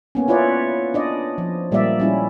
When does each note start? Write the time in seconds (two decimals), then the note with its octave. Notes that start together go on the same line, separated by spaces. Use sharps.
0.15 A#3 B3 C#4
0.28 E4 F4 B4 C#5 D5
0.94 D4 D5 D#5
1.38 F3
1.72 A#2 G3 G#3 A#3 D5 E5
2.00 G3 C#4 E4